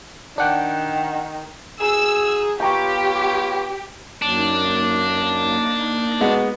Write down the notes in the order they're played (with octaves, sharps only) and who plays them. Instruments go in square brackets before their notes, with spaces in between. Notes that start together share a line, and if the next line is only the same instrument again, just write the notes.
[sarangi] D#3 [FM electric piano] D4 F#5 G5
[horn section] D#4 F#4 G#4 [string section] E6
[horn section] B3 F4 C#5 [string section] G4 [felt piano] G5 A#5 C#6
[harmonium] F#2 F#3 [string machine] A#3 D#4 [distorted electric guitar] D4
[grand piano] G#3 B3 D#4 [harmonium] F#4